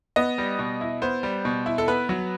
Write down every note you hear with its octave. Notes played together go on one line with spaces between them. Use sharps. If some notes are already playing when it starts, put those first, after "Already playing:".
B3 D#5
G3
B2
E4
B3 C5
G3
B2
E4
A4
B3 B4
F#3